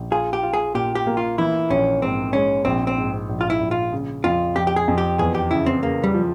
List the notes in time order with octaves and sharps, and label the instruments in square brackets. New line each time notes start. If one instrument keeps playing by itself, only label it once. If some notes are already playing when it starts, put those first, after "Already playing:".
Already playing: [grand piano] A#1
[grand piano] F4 [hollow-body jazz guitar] G#4
[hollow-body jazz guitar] G4
[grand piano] F4
[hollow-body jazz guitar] G#4
[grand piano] A#2 [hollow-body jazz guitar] G4
[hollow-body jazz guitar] G4
[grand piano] A#3
[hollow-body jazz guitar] F4
[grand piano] E3 [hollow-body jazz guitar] E4
[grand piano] A#1 [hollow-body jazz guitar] C#4
[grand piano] G#2 [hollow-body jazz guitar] C4
[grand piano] G#3 [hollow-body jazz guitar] C#4
[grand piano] A#1 [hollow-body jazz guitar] C4
[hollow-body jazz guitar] C4
[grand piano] G#2
A#1
[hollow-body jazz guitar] F4
E4
[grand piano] A#1
[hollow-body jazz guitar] F4
[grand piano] C#3
[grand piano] F2 [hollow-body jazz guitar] F4
[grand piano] F2 [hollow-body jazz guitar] G4
[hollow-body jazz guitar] G4
G#4
[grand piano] F2
[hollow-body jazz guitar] G4
[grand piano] E2 [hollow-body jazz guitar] G#4
[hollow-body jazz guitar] G4
[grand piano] C#3 [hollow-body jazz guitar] E4
[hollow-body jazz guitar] C4
[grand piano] C#3 [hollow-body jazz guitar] A#3
[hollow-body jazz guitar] G3
[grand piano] F3